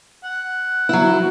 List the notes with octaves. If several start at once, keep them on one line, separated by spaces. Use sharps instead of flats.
F#5
F#3 E4